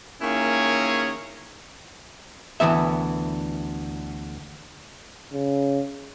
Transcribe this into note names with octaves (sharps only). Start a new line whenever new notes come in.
D#3 A#3 C#4 E4 G#4 C#5
D2 E3 B3 E5
C#3